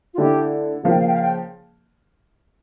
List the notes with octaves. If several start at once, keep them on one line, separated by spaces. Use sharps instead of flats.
F4
D3 A3 E4 G4
C#3 F3 A#3 F5
G5
F5
G5
F5
G5